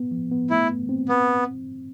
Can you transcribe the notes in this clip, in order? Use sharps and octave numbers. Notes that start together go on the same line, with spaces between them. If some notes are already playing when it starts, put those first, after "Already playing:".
Already playing: B3
F3
B3
A3 E4
G2
C4
B3 C4